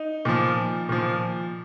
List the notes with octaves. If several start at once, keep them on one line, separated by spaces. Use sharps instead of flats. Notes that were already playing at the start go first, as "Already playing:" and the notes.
Already playing: D#4
A#2 F3
A#2 F3